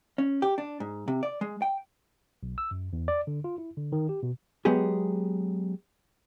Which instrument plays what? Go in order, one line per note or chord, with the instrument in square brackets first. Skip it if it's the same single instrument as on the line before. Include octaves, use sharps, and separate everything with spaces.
[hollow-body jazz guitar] C#4
G4
D4
G#2
C3
D5
G#3
G5
[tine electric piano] B1
E6
F#2
E2
D5
D3
F4
E4
D3
D#3
G4
B2
[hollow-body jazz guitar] F#3 G#3 B3 G4 G#4